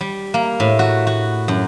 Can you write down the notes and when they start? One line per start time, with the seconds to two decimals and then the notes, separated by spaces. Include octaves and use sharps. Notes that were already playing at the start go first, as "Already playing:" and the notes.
0.01 G3
0.34 A#3
0.60 A2
0.79 F#4
1.07 F#4
1.48 F#2